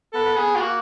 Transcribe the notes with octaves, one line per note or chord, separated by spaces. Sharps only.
B3 A4
B3
B3 G#4
B3
F4
A#3 F#4